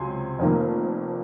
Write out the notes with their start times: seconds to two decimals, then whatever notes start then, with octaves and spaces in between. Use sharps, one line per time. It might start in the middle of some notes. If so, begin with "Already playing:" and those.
Already playing: C#2 C3 F#3 C4 G#5 C6
0.39 F1 F2 D#3 A#3